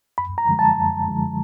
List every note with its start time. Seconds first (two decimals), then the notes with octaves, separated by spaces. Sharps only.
0.18 F#2 B5
0.38 A#5
0.48 D3 F3 G#3
0.59 A5
0.78 F#2
1.08 D3 F3 G#3